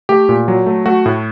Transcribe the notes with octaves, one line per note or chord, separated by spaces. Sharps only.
A3 G4
A#2
F#3
A3
A3 F#4
A2